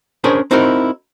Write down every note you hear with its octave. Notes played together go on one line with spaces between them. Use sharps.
C#4 D4 G#4 A#4 C5
C4 D#4 E4 F#4 A#4